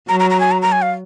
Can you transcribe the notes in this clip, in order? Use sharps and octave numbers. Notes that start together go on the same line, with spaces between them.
F#3 A#5
A#5
A#5
G#5
A#5
A#5
G#5
F5